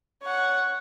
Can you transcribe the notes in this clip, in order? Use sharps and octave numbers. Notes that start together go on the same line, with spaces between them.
C#5 F#5